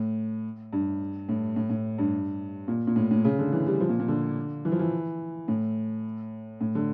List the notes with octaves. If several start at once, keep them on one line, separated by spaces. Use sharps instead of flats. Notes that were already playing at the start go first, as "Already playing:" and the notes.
Already playing: A2
G2
A2
A2
A2
G2
A#2
A#2
A2
A2
C#3
D3
E3
G3
F3
A#2
A#2
D3
E3
F3
E3
A2
A2
D3